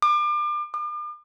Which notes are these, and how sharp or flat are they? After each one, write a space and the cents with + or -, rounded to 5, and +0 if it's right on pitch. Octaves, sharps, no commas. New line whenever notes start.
D6 +35
D6 +45